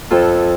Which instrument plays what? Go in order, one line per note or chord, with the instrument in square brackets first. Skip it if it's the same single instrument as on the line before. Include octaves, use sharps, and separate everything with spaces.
[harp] F2 F4 A4